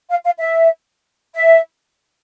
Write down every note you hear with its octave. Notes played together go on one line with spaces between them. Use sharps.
F5
F5
E5
E5